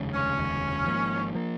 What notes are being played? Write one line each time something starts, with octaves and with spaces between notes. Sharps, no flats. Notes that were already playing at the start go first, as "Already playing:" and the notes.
Already playing: F1 D#2 C#3 G#3
C#4
F1 D#2 C#3 G#3
G#1 G#2 F3 A#3
F3 A#3